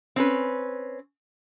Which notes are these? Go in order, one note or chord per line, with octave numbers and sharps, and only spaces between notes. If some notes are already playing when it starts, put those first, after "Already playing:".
C4 C#4 B4